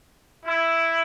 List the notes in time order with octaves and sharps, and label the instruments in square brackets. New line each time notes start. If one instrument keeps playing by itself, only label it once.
[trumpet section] E4